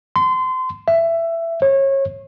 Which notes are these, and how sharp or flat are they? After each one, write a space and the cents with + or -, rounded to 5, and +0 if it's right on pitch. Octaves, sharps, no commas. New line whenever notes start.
C6 -30
E5 +15
C#5 -30